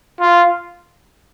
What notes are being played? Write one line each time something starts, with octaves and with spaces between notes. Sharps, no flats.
F4